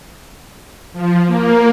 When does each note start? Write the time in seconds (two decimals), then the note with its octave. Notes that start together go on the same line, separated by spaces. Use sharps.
0.93 F3
1.26 A#3